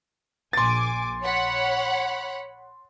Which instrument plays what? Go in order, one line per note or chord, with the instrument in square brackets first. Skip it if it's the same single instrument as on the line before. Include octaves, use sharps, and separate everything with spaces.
[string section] A#1 G#5 D6 [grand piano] C6 A6
[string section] C#5 F#5 B5